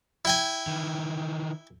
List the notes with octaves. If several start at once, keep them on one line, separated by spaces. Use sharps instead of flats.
E4 G5 G#5
D#3 E3